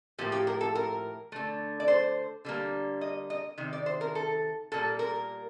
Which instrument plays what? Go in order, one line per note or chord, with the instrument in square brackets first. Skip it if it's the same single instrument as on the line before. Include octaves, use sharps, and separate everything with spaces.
[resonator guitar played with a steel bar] A2 F3 A#3 G4
G4
A#4
A4
A#4
D3 A3
D5
C5
D3 G3 A#3
D#5
D#5
C3 D#3
D5
C5
A#4
A4
A#2 G3 A#3 A4
A#4